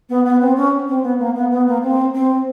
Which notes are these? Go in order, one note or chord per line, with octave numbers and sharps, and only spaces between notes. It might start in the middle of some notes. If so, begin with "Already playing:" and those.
B3
B3
C4
C#4
C4
B3
A#3
B3
B3
A#3
C4
C4